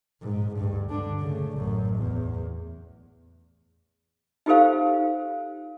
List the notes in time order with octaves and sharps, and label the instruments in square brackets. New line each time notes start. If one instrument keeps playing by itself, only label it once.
[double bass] G#2
D2 G2
D3 D4
C#3 A3
A1 F#2
E2
[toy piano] D#4 F4 G4 A4 C5 F5